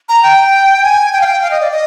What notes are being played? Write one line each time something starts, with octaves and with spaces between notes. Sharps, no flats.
A#5
G5
G#5
G5
F5
G5
F5
D#5
D5
D#5